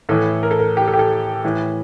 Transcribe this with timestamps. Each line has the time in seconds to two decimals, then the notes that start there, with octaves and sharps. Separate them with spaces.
0.09 A2 E3 A4
0.43 A#4
0.51 A4
0.59 A#4
0.77 G4
0.88 A4
0.94 G4
0.99 A4
1.44 A2 E3